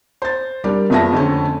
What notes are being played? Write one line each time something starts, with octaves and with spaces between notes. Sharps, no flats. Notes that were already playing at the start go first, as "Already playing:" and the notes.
C5 A6
G3 D4 G4 A#4
F#1 F3 B3 E5 A5 A#6
F2 D3 A3 C4 C#4